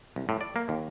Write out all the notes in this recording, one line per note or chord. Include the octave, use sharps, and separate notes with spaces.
C2
A2
D5
A#3
D#2